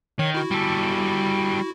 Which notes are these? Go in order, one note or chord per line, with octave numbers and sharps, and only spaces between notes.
D#3 C#5
E4 F#4
G3 A4